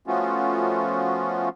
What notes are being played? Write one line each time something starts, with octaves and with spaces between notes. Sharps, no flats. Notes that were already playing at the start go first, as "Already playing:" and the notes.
F3 A3 B3 C#4 F4 F#4